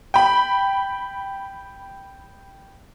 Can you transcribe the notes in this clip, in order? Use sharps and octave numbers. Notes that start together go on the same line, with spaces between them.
G5 B5